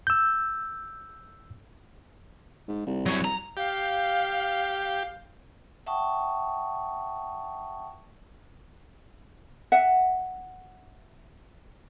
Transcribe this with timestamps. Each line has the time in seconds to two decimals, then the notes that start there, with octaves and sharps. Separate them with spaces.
0.07 E6 G6
2.68 G#2
2.86 C2
3.06 F#3 C#4
3.25 A#5
3.57 G4 F5
5.86 E5 F#5 G5 A5 C#6 D#6
9.72 E5 F#5